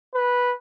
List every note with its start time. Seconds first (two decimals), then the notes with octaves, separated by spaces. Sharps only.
0.15 B4